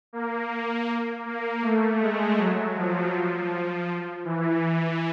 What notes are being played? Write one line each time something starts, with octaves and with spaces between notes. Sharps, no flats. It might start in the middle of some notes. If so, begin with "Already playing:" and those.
A#3
A#3
A3
G#3
F#3
F3
F3
E3